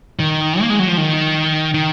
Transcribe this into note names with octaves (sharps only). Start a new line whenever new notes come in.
D#3
A#3
G#3
F#3
F3
D#3
D#3